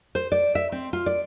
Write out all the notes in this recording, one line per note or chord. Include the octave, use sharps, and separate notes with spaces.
C5
D5
E5
C4
F4
D5